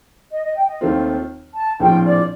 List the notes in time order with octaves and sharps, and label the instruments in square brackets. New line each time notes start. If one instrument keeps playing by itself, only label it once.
[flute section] D#5
D#5
G5
D#5
[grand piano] D#2 D#3 A3 C4 F4
[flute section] A5
[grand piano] A#1 A2 F3 C4 F4 [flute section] G5
[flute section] D5